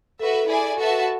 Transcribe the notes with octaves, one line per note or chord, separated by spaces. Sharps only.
F#4 A4 B4 E5
A4
E4 G#4 D5 G#5
F#4 A4 B4 E5 A5